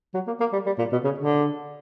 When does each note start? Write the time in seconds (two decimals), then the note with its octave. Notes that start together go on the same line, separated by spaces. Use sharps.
0.14 F#3
0.27 A#3
0.40 A#3
0.53 G3
0.66 G3
0.78 A#2
0.92 B2
1.04 C#3
1.18 D3